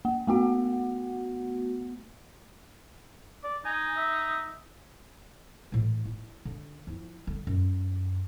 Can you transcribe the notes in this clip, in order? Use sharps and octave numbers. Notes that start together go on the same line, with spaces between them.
A#3
A3 B3 F#4 F#5
D5
D#4 G#5
E5
A2 E3
E4
D3
F3 E4
D3 G3
F#2